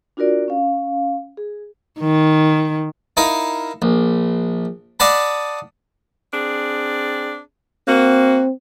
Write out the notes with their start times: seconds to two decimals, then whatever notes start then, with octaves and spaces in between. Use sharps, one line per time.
0.17 D4 F4 F#4 A#4 D5
0.48 C#4 F5
1.37 G#4
2.00 D#3
3.17 D#4 E4 A#4 F5
3.82 A#1
5.00 D5 D#5 F5 F#5 A5 B5
6.33 C4 D4 G#4
7.87 A#3 C4 F#4